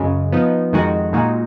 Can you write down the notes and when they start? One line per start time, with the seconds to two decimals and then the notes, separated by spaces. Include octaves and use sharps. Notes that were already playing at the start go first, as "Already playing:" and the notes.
Already playing: F#2 C#3 G#3
0.32 F3 B3 D#4
0.72 F2 D#3 G#3 D#4 F#4
1.13 A#2 G#3 D#4 F#4